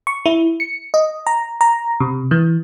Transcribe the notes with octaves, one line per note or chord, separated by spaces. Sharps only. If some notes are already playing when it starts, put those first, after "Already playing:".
C#6
E4
C#7
D#5
A#5
A#5
C3
E3